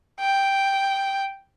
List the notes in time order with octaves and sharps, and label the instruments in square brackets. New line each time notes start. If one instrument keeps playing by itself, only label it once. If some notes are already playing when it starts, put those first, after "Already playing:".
[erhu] G5